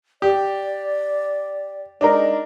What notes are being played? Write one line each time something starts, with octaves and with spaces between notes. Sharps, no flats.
G4 D5
G#3 D4 D#4 A#4